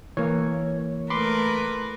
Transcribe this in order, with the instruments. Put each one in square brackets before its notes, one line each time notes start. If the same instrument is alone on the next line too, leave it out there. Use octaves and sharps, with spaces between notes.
[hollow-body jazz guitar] E3 A#3 [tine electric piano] C#5
[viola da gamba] A3 A#4 B4 [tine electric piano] B5 C6 D6